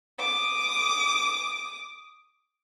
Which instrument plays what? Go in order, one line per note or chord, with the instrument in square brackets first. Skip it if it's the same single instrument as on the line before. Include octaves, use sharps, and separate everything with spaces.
[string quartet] D6 D#6